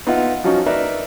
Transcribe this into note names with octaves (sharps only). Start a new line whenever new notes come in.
B3 D#4 F4 E5 F#5
F3 F#3 C#4 D#4 F#4
D#4 A#4 B4 D5 E5